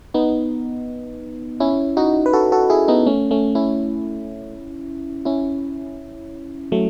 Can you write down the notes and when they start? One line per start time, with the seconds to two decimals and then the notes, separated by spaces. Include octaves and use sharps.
0.14 B3 D#4
1.60 C#4 E4
1.97 D#4 F#4
2.26 B4
2.33 F#4 A4
2.52 F#4 A4
2.70 E4 G#4
2.88 B3 D#4
3.06 A3 C#4
3.31 A3 C#4
3.55 C#4 E4
5.25 C#4 E4
6.72 F#3 A3